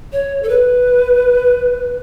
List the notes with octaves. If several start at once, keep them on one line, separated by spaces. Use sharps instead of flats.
C#5
A4
B4